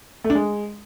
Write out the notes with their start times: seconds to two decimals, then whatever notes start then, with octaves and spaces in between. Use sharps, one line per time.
0.24 A3
0.30 D4
0.35 G#3